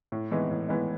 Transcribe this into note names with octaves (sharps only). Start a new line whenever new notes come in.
A2
E3 G#3 B3 D#4
A2
E3 G#3 B3 D#4